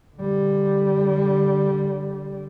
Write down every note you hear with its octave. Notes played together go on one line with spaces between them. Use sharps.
D3 G3